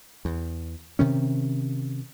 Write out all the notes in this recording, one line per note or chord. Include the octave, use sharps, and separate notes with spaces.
E2
C3 D#3 C#4